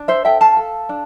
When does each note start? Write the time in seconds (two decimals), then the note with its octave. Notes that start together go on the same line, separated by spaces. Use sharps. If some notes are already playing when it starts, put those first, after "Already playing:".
Already playing: D4
0.08 C5 E5
0.25 A4 E5 G5
0.41 F5 A5
0.57 A4
0.89 D4